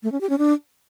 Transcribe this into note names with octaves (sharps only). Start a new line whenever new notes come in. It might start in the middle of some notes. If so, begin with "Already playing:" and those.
A3
C#4
G4
C#4
D4